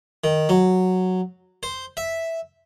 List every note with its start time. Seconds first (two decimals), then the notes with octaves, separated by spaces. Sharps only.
0.24 D#3
0.49 F#3
1.63 C5
1.97 E5